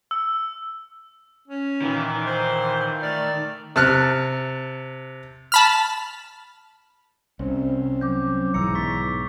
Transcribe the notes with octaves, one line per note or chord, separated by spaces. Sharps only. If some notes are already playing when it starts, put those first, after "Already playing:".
E6
C#4
A#2 D#3 E3
C5
A3 D5 F6
C3 A5 F6 F#6
A5 B5 F6
C2 C4 C#4
F#3 D6 G6
B1 G#2 E3 A#5 E6 C#7
C#6 A6 B6